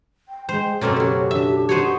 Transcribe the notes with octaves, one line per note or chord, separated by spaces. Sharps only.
G5
G#3 C5
F#2 B2 A3 A#3 C4 C#4 A4 C#5
C#3 F#3 G4
D4 E5
B3 D#4 F#4 C5 C#5